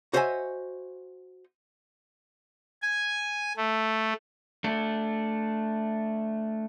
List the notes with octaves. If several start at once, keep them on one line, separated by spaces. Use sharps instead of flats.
F#4 C5 C#5 D#5 E5 G#5
G#5
A3
A3 D4